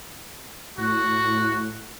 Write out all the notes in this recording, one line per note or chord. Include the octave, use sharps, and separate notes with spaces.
A2 F#4